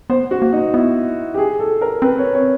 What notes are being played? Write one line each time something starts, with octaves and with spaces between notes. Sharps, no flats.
B3 C5
F#4
A#3
D#4
B3 E4
G4
G#4
A4
A#4
C4 B4
C#5
C#5